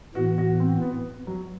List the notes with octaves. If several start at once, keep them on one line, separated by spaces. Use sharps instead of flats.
A2 E3 B3 F#4
F#4
C4
B3
F#3